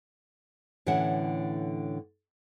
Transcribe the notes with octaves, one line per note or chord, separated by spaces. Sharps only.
A2 D3 E3 C#4 E5 F#5